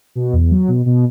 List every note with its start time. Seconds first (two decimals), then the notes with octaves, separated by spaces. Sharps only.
0.15 B2
0.33 E2
0.51 F#3
0.68 B2
0.86 B2